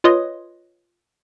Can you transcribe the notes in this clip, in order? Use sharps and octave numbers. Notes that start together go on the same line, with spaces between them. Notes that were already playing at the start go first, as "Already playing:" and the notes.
F4 B4 C#5 D#5 C6 D#6